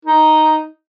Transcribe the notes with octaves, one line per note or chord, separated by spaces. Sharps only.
D#4